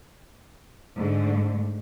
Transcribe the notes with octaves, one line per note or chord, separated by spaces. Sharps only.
G#2 D3 A3